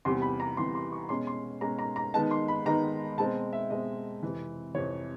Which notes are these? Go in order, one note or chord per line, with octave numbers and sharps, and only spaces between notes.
E2 C3 E3 G3 C6
B5
A#5
E2 C3 E3 G3 C6
C6
C#6
B2 G#3 C#4 C6
C6
B2 G#3 C#4 A#5
A#5
A#5
D#3 G#3 B3 D#4 A5
C6
B5
D#3 G#3 B3 D#4 A#5
B2 G#3 C4 A5
E5
B2 G#3 C4 D#5
F2 C3 E3
F2 C3 E3 C#5